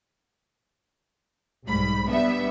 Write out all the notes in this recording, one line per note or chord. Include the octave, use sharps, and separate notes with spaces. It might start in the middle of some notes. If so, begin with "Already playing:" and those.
B1 G#2 G3 B5
G3 B3 D4 E5